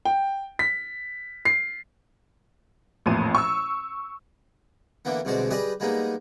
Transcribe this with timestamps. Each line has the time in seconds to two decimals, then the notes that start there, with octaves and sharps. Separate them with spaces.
0.05 G5
0.59 B6
1.45 C7
3.06 A1 F2 A#2 D#7
3.35 C#6 E6
5.05 D3 E3 A#3 B3
5.25 C2 B2 D3 G#3 C5 D5
5.51 G3 G4 G#4 B4 D5 D#5
5.80 G3 G#3 A#3 B3 D#4